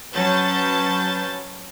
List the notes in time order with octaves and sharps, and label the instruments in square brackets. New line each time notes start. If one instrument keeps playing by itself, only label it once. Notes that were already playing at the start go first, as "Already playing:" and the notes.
[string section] F#3 C#4 B4 A5 G6 A6